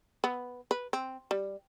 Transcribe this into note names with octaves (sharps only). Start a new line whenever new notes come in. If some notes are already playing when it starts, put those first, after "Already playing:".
B3
B4
C4
G3